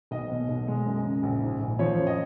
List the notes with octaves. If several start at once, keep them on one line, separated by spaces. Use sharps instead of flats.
B1 D#5
B2
B1
G#3
F#2
C#3
A#1
G#2
A#1
F3 C#5
F#2
D#5